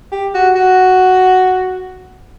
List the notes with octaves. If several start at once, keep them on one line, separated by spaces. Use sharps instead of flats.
G4
F#4
F#4